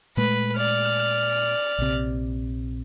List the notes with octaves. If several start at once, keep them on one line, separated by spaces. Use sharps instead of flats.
A#2 G#3 A3 B4
D5 F6
A#1 C3